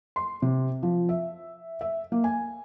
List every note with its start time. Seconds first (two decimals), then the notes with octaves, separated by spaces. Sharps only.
0.16 C6
0.42 C3
0.83 F3
1.09 E5
1.81 E5
2.12 A#3
2.24 G#5